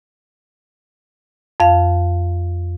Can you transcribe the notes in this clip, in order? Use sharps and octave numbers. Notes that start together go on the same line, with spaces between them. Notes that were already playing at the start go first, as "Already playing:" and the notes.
F2 F5